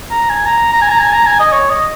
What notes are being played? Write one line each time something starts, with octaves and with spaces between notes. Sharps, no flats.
A#5
G#5
A#5
A#5
G#5
A#5
G#5
A#5
G#5
D#5
C#5
D#5